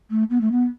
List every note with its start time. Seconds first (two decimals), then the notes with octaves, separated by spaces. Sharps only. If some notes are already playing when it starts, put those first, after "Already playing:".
0.10 A3
0.30 B3
0.41 A3
0.52 B3